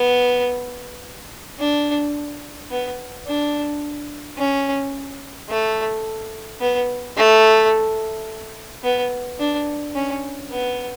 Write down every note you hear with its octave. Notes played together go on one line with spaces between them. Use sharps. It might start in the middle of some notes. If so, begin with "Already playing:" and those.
Already playing: B3
D4
B3
D4
C#4
A3
B3
A3
B3
D4
C#4
B3